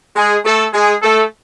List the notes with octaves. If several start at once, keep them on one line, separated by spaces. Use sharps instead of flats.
G#3 G#4
A3 A4
G#3 G#4
A3 A4